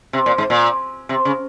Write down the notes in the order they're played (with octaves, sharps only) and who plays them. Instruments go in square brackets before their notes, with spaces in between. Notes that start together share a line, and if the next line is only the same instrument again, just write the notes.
[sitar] C3
A#2
G#2
A#2
C3
C#3